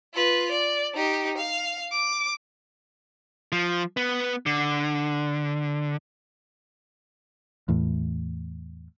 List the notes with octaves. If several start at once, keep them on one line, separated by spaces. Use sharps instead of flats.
F4 B4
D5
D#4 G4
F5
D6
F3
B3
D3
E2 A2